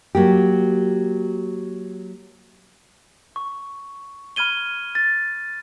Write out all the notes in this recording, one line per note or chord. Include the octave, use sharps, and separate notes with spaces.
F#3 A#3 G4
C#6
B5 F6 G#6 D#7 G7
A6